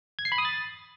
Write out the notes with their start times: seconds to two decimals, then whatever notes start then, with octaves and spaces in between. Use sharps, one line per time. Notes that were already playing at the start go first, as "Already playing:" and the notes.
0.19 G#6
0.25 C7
0.32 B5
0.38 D#6
0.45 A6